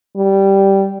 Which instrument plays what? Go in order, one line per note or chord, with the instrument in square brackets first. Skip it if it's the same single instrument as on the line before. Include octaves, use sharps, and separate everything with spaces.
[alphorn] G3